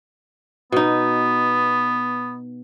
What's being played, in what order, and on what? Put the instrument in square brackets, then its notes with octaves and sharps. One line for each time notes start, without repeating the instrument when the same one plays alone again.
[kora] B2 D#4 [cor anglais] B3